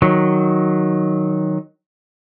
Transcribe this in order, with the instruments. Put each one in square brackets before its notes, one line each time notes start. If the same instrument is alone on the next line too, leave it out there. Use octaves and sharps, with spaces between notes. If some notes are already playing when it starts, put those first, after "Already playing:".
[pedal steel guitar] D#3 F#3